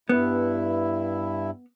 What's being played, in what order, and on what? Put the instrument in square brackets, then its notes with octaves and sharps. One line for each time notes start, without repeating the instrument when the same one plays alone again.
[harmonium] G2 E4 [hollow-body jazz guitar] B3